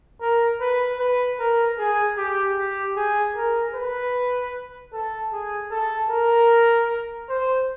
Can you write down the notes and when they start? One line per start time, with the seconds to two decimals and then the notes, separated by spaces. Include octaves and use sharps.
0.21 A#4
0.61 B4
0.99 B4
1.39 A#4
1.79 G#4
2.18 G4
2.57 G4
2.96 G#4
3.36 A#4
3.75 B4
4.93 A4
5.33 G#4
5.71 A4
6.11 A#4
7.29 C5